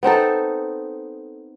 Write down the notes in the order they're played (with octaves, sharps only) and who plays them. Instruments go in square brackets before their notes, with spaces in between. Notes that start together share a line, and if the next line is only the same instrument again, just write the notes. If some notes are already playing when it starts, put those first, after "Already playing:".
[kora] B3 C4 D#4 A4